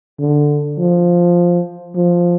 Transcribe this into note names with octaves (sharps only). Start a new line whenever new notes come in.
D3
F3
F3